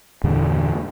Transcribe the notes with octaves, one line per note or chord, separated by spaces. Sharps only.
E2 G2 A#2 D3